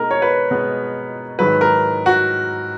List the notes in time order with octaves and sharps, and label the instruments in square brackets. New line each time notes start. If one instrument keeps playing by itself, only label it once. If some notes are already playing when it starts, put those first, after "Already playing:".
Already playing: [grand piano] B2 G#3 B3 D#4 A#4
C#5
B4
B2 G#3 B3
G#2 D#3 F#3 B4
A#4
F#4